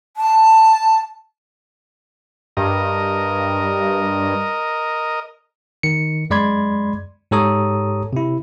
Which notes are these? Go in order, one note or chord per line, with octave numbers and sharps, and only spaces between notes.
A5
G2 A#4 D#5
D#3 C#7
F#2 G#3 D5 B5 C6 G#6
G#2 G4 A4 C#5 A#5 D#6
C3 E4